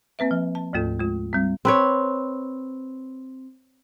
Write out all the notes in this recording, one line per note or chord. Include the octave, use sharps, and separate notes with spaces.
A#3 C4 B4 E5
F3
A5
D2 G#2 A3 F4 A4
G#3 F4
G3 C4
C4 B4 C#5